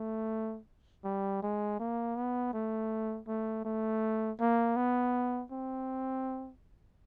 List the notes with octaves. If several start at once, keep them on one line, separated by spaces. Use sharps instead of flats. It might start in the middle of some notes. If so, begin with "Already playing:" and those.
Already playing: A3
G3
G#3
A#3
B3
A3
A3
A3
A#3
B3
C4